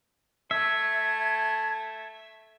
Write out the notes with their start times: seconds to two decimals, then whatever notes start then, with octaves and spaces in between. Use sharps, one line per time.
0.51 A3 E5 G#6